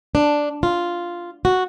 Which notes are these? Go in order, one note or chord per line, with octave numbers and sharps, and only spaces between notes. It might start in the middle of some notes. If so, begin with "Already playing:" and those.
D4
F4
F#4